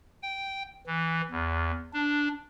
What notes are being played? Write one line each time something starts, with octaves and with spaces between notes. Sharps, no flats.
G5
E3
E2
D4